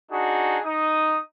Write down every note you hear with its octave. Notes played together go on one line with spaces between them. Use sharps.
D4 D#4 F#4 G#4
D#4 D#6